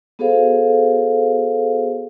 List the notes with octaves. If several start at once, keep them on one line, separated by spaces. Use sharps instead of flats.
B3 F#4 G#4 A4 C5 F5